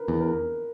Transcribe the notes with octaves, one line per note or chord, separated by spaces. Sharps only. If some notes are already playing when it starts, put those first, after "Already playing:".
Already playing: A#4 B4
E2
A#4